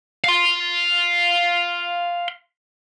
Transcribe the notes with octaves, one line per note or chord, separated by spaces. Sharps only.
F5 C6